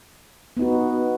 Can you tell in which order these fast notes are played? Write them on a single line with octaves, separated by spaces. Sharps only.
B3 D#4 F#4